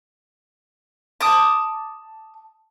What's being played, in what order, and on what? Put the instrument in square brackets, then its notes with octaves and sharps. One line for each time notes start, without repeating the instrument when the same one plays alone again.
[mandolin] A5 D6 D#6